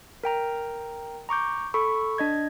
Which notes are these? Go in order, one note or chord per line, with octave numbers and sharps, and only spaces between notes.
A#4 G5 A#5
A#5 C#6 D6 G6
A4 B5 C#6
D4 D#5 G#6